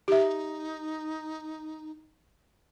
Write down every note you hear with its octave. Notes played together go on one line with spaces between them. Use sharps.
D#4 G4 E5